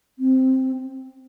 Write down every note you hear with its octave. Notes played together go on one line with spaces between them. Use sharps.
C4